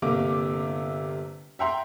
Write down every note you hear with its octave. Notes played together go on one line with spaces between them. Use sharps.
G1 C3 A#3 D6
E5 F#5 G5 A#5 C6